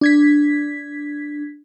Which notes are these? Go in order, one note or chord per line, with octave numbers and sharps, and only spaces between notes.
D4 G#6 B6